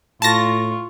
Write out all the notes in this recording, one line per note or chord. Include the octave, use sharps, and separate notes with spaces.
A2 F4 A5 C#6 A#6